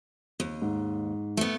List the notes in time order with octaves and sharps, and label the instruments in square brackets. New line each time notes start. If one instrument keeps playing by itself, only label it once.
[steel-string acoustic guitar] D#2
[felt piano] G#2
[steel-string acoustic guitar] A3 B3